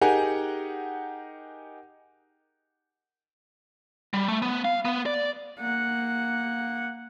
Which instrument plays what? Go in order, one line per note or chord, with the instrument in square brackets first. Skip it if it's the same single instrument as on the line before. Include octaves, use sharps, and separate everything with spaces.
[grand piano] D#4 G4 G#4 A#4 F#5 G#5
[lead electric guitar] G3
A3
B3
F5
B3
D5
[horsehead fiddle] A#3 F#5